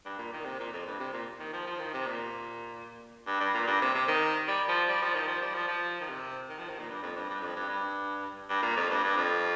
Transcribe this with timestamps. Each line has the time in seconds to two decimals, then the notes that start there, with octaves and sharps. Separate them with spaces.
0.05 G2
0.18 A#2
0.33 D#3
0.45 C3
0.59 A#2
0.73 F2
0.87 G2
0.99 C3
1.13 A#2
1.39 D#3
1.53 F3
1.67 F3
1.79 D#3
1.94 C3
2.06 A#2
3.27 G2
3.40 G2
3.54 A#2
3.67 G2
3.81 C3
3.95 C3
4.08 D#3
4.48 G3
4.68 F3
4.89 G3
5.02 F3
5.14 D#3
5.28 F3
5.42 G3
5.54 F3
5.68 F3
6.01 D#3
6.09 C3
6.49 D#3
6.59 F3
6.69 D#3
6.79 A#2
6.89 G2
7.02 F2
7.16 G2
7.29 G2
7.42 F2
7.56 G2
7.69 G2
8.49 G2
8.62 A#2
8.76 F2
8.90 G2
9.04 G2
9.17 F2